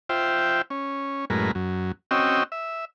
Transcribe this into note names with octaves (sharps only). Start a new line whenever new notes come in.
F4 C5 E5 G5
C#4
F#2 A2 G#3 A#4 B4
F#2
C4 C#4 F#4 D#5 G5 E6
E5